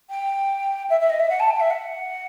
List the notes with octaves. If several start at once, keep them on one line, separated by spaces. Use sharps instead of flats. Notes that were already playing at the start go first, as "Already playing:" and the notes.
G5
E5
E5
D#5
E5
F#5
A5
G5
E5
F#5